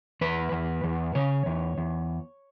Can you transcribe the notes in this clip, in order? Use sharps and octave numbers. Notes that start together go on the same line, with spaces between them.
E2 B4
E2
E2
C#3 C#5
E2
E2